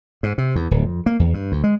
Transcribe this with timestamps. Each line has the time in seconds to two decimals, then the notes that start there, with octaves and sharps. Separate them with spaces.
0.23 G#2
0.38 C3
0.56 E2
0.71 D1
0.83 F2
1.06 A#3
1.19 E2
1.34 G2
1.52 D2
1.64 G#3